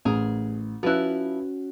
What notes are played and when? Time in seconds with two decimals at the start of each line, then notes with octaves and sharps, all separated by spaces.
0.05 A1 G#4 A#4
0.83 F3 C#4 E4 F#4 B4 F#6